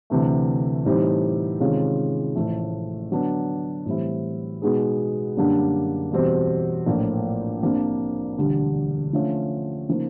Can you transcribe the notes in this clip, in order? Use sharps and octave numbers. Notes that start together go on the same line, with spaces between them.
D2 C3 E3 A3
A2 E3 G3 C4 D#4
C3 D#3 G#3 C#4 F4
A1 A2 F3 A3
D3 F#3 B3 D4
A2 E3 G3 C4 E4
B2 G#3 B3 D#4 G#4
F#2 D3 G3 A#3 D4
E2 B2 G3 C4
A#1 A2 F3 A#3
C2 C3 F3 A#3 D4
E1 D2 D3 G3
D3 F3 A3 C#4 F4
C#3 F3 A#3 D#4